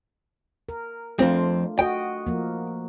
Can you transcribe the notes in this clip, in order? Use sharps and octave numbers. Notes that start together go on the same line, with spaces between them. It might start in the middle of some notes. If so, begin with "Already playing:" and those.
A#4
F2 A3 C4 D4 F4
F#4 D#5 G5
F3 A#3